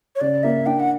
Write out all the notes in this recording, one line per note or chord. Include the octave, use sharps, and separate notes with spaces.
C#5
C#3 D5
A#3 E5
D4 G5
F#5